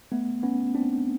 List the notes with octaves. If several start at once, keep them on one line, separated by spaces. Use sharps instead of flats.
A3 B3
B3 C#4
C4 D4